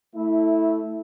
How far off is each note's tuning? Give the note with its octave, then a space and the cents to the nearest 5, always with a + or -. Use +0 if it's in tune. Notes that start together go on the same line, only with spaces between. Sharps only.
A3 +0 E4 -15